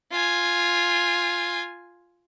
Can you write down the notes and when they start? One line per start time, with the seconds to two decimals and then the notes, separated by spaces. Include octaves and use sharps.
0.11 F4 G#5